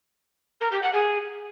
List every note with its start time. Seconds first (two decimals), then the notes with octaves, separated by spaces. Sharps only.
0.60 A#4
0.71 G4
0.82 F#5
0.93 G#4